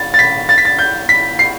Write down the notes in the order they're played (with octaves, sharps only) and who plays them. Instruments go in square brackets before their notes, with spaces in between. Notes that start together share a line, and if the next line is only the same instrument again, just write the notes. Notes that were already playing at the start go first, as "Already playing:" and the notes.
Already playing: [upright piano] A6
A6
B6
A6
B6
A6
G6
B6
C7